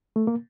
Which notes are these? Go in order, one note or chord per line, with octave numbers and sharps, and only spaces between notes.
A3
A#3